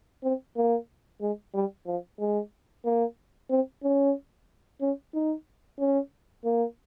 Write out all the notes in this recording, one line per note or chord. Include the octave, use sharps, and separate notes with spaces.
C4
A#3
G#3
G3
F3
G#3
A#3
C4
C#4
C#4
D#4
C#4
A#3